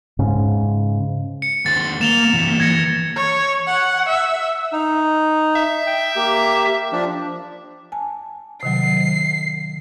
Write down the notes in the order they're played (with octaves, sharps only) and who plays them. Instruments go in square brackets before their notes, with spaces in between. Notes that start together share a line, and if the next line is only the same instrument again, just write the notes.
[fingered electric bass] G#2 C#3
[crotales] C#7
[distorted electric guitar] D#2 C5 [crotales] A6
[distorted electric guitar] A#3 [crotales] E7 F7 G7
[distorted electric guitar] E3 A#3
[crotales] G#6 A#6 C#7
[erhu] C#5
F#5
E5
[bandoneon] D#4
[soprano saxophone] E5
[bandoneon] G5
A#3 G4
F3 D4
[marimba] G#5 A5
[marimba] C3 D#3 F#3 [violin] C7